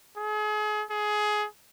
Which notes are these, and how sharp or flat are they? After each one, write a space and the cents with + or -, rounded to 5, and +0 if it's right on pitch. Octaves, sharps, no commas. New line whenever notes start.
G#4 +35
G#4 +20